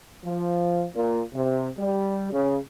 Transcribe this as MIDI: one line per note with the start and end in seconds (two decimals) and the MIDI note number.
0.24 0.86 53
0.95 1.22 46
1.34 1.69 48
1.78 2.29 55
2.31 2.57 49